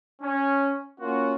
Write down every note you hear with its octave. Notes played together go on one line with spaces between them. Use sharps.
C#4
A#3 C#4 F4 F#4